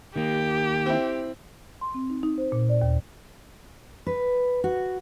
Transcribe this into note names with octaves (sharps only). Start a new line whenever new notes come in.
D#3 A#3 G4
C4 E4
C6
C4
D#4
D#4
C5
A#2
D5
D#2
B4
F#4